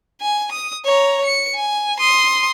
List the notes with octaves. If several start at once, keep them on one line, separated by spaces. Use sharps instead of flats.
G#5
D#6
C#5 A#5
C#7
G#5
C6 D#6